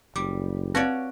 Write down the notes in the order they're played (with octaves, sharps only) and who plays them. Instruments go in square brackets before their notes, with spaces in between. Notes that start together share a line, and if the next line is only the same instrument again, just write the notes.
[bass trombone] F#1 [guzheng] G3 [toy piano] D6
[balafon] C4 [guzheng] F#4 C#5 D5 [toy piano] B4 F5